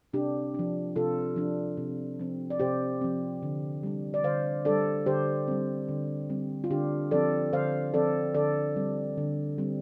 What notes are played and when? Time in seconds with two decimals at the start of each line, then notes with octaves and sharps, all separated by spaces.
0.13 C3 D4 G4
0.54 F3 D4
0.96 C3 F4 A4
1.36 F3 D4
1.77 C3
2.20 F3 C4
2.50 D5
2.60 C3 G4 C5
3.01 F3 C4
3.43 D3
3.83 G3 D4
4.14 D5
4.24 D3 C5 F5
4.65 G3 D4 A4 D5
5.06 D3 G4 C5
5.48 G3 C4
5.89 D3
6.30 G3 C4
6.64 F4
6.71 D3 D4 G4
7.11 F3 C4 A4 D5
7.53 D3 C5 F5
7.94 F3 C4 A4 D5
8.35 D3 A4 D5
8.76 G3 C4
9.18 D3
9.58 G3 C4